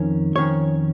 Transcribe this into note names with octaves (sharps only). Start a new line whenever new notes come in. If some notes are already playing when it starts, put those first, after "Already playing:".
Already playing: F2 D#3 C#4
F2 D#3 C#4 C#5